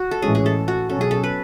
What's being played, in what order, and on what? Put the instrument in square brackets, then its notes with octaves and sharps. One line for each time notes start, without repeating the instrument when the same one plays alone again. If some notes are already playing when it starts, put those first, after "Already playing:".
Already playing: [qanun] F#4
A4
[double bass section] A2 E3 G#3 C#4 [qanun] G#4
[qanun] G#4
A4
F#4
[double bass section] B2 F#3 C#4 [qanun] A4
[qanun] G#4
A4
B4